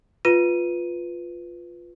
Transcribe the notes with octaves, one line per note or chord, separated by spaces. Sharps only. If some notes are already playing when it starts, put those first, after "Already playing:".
F4 B4 D#7